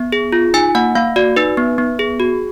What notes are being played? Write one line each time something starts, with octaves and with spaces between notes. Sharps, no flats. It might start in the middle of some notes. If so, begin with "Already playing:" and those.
Already playing: B3
G#4
F4
D#4 G#5
A#3 F#5
A#3 F5
F#4 D5
D#4 B4
B3
B3
G#4
F#4